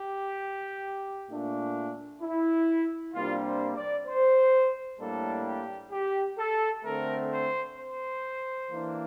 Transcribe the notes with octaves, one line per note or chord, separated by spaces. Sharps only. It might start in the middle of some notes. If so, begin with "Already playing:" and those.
Already playing: G4
A#2 A3 D4
E4
C3 G3 A#3 D4 F4
C5
D5
C5
A2 G3 A#3 D4 A4
G4
G4
A4
D3 A3 C4 A#4
C5
C5
E3 A#3 D4